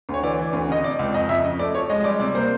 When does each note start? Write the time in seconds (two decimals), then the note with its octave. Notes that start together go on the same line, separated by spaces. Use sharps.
0.09 D2
0.14 C#5
0.23 E3 D5
0.39 E3
0.53 D2
0.69 C#3 D#5
0.84 C3 D5
0.99 C#2
1.14 F2 D#5
1.29 F2 E5
1.44 C#3 D#5
1.59 A3 D5
1.75 F3 C#5
1.90 G#3 D#5
2.00 D#5
2.04 G3 D5
2.20 C3 D5
2.35 A#3 C5